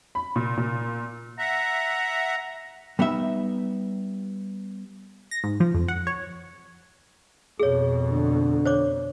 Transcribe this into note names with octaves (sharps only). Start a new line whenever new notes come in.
B5
A#2
A#2
E5 F#5 A#5
G3 B3 D#4 E5
A#6
G#2
F3
F2
F#5
C#5
F2 B2 G#4 C#5
D3
C5 C#5 D6